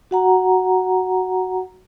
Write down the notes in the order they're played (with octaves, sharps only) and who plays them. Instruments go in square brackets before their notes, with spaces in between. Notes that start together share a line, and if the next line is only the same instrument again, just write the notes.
[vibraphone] F#4 F#5 A#5